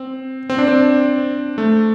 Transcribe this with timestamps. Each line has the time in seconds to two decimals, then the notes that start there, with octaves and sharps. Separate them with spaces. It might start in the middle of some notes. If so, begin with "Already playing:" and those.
Already playing: C4
0.50 C4
0.58 D4
0.68 C4
1.58 A3